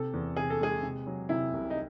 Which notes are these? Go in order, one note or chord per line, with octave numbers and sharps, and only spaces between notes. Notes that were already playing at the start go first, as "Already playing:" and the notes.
Already playing: C3 A4
E2
C3 G#4
A4
G#3 G#4
C3
F#3
C3 E4
C2
D#4